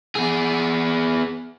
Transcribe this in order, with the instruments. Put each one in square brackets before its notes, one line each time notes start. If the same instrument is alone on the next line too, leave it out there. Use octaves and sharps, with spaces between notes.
[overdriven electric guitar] B3 G#4